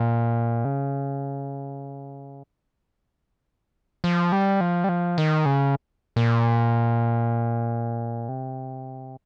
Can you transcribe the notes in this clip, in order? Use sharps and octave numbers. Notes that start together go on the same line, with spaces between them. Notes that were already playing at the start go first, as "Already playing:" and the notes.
Already playing: A#2
C#3
F3
G3
F3
G3
F3
D#3
C#3
A#2
C3